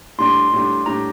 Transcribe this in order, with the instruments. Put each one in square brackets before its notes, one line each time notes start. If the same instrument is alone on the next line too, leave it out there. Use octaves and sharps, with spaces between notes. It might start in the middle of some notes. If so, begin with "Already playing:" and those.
[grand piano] A2 G3 D4 [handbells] C6
[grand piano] A2 G3 D4
[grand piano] A2 G3 D4 [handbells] A#5